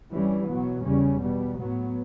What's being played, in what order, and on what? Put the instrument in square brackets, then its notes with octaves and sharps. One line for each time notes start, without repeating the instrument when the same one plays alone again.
[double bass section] G2 E3 G3 C#4
B2 F#3 B3
E2 C#3 G3 C#4
B2 G3 B3
A2 F#3 B3